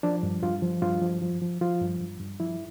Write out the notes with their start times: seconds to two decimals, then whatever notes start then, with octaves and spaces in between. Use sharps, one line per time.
0.03 F3 D4
0.23 G2
0.43 G2 F4
0.62 F3
0.82 G2 F4
1.02 F3
1.22 F3
1.42 F3
1.61 F3 F4
1.81 G2
2.00 G2
2.20 G2
2.40 F3 E4